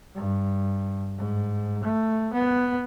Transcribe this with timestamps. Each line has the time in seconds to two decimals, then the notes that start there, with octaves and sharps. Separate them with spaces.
0.15 G2
1.17 G#2
1.84 A3
2.33 B3